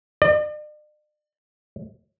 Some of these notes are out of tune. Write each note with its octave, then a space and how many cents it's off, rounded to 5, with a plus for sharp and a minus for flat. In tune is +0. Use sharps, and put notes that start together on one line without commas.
D5 +45